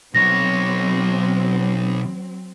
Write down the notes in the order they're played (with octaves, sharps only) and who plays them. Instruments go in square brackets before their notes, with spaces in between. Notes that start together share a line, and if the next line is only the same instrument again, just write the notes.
[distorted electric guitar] B1 C#5 [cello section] F#3 C4 [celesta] A#6